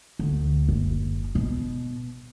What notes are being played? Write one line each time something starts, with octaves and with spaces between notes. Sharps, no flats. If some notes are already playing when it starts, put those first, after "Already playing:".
D2
F#1
B2